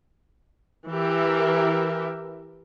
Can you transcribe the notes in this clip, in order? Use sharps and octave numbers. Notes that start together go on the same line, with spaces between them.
E3 G4 A#4 E5